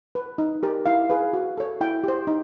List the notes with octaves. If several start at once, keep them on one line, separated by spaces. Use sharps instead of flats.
B4
D#4
G4 A#4
E4 F5
G#4 B4
F#4
A4 C#5
E4 G5
G4 C5
D#4